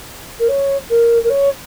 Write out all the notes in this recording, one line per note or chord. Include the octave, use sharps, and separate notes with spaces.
A#4
C#5
A#4
A#4
C#5